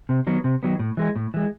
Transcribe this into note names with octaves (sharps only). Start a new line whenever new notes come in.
C3
D#3 F#3 B3
C3
D#3 F#3 B3
A2
E3 G#3
A2
E3 G#3